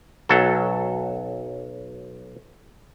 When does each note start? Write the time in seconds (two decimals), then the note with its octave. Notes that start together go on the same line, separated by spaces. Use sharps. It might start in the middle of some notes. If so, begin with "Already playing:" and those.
0.29 B1 F#3 A4